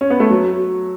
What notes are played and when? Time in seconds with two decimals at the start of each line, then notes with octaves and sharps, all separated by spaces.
0.01 C#4
0.10 B3
0.20 A3
0.30 F#3